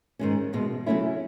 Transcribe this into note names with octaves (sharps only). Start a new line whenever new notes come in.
G#2 D#3 G#3 C#4
E2 B2 G#3
C#3 F#3 A3 C#4 E4